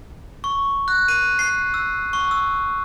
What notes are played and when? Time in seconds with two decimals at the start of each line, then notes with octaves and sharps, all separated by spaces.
0.44 C#6
0.88 F#6
1.08 D#7
1.39 C7
1.74 E6
2.13 C#6
2.31 E6